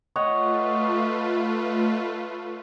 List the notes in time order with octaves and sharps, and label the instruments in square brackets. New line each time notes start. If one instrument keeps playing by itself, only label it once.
[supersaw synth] A3 F4 B4 [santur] C#5 D#5 F#5